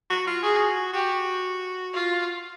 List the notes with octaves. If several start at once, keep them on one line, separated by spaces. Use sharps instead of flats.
F#4
F4
F#4 G#4
F#4 G4
F4